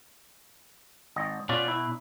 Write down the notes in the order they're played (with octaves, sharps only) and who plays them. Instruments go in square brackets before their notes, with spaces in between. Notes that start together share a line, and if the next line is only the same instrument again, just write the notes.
[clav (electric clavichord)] G#1 D#5
[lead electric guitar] B2 [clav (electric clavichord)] C#4 F4 D5
[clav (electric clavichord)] E4